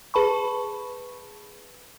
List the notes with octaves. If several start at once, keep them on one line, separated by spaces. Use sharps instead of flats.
G#4 B4 A5 B5 C#6